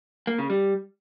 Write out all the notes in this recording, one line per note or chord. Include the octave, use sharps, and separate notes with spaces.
A#3
C#3
G3